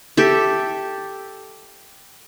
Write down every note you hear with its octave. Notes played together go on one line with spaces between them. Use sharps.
G4 A4 E5